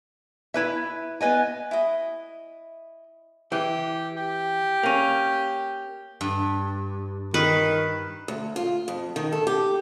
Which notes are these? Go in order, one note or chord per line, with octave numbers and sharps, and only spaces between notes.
E4 B4 E5
B3 B4 D#5 G#5
E4 D#5
E3 G4
G4
A#3 C#4
G2
D#3 B4
D2
F4
F2
D#3
A4
G4